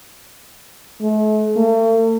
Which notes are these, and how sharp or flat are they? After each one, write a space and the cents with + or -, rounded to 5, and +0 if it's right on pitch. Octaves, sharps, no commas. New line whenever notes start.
A3 -45
A3 +45